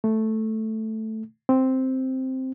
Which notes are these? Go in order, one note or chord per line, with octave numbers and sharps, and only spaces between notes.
A3
C4